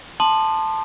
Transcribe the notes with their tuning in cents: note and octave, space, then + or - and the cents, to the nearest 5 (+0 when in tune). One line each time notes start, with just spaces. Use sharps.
A5 +0 C6 +0 D#6 -40